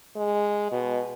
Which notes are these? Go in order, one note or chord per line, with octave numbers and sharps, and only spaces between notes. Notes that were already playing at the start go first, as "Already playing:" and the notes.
G#3
B2